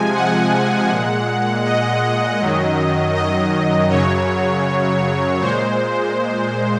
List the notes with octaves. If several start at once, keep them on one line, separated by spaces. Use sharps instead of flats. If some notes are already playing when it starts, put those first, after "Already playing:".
Already playing: C3 F3 G#3 G#5
F#5
A#2 G#3
D#5
F#2 D#3 F#3
D#5
F#2 C#3 F#3 C#5
A#2 G#3 C5